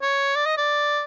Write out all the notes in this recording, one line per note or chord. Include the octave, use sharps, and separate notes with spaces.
C#5
D5
D#5
D5